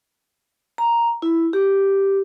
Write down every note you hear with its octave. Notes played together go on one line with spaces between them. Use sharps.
A#5
E4
G4